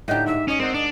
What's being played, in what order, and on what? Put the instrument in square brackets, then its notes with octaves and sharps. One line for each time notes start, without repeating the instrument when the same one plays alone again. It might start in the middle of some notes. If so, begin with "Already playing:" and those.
[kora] A2 D3 [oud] D#4 G4 [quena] G6
[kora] G#2 [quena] E5
[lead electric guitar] C#4 [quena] D#5
[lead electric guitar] C4 [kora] A#4 D5 F#5
[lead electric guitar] D4 [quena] D#5